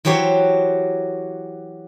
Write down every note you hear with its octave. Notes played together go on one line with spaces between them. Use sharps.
E3 F#3 G4 C5 C#5